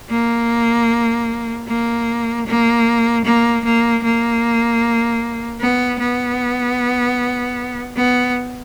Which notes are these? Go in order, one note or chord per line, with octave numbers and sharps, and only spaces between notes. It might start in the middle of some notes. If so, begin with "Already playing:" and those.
A#3
A#3
A#3
A#3
A#3
A#3
B3
B3
B3